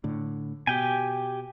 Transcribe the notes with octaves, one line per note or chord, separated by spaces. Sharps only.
A2 D3
B2 G4 G5 G#5